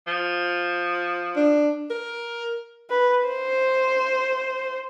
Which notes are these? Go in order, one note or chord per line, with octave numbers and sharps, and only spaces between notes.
F3
D4
A#4
B4
C5